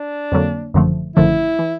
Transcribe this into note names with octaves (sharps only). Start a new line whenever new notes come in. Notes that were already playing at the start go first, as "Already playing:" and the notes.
Already playing: D4
F2 D3 F#3 A#3
G#1 F#2 D3 F3 A3
G#1 F#2 D3 F3 A3 E4
E3